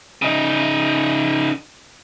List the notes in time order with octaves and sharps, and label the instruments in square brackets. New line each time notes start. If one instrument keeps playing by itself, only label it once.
[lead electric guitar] C#3 D#4